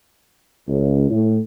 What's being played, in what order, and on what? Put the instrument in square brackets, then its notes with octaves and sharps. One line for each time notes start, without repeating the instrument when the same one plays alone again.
[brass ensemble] C#2
A2